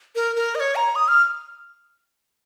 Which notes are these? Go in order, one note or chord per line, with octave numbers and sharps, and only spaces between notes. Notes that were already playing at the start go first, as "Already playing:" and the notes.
A#4
A#4
D#5
C#5
A#5
D#6
F6